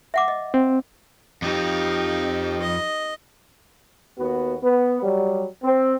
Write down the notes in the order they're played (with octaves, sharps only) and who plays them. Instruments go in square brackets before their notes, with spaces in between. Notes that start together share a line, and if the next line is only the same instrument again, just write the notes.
[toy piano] E5 F#5 D6
D#5
[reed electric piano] C4
[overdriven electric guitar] F2 F3 [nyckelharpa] D#4 G4
[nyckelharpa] D#5
[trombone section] D#2 B3 F#4
B3
F#3 G3
C4